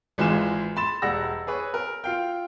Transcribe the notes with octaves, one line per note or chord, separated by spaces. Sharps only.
G#1 E3 G#3 F4 G#5 E7
B5 C6 A6 E7
E1 G3 F#5 E6 A#6
G#4 B4 C#5
A#4
F4 F5 G5